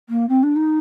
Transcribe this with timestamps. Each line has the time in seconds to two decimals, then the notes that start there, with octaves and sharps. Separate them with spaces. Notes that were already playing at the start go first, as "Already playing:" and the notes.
0.09 A#3
0.29 C4
0.43 D4
0.56 D#4